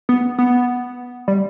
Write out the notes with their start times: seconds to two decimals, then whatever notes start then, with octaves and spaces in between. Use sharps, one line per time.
0.09 B3
0.38 B3
1.28 G3